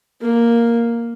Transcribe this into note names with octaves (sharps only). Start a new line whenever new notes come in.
A#3